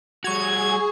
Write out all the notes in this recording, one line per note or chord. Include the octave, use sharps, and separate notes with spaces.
G3 F#4 G#4 C#6 G#6 F7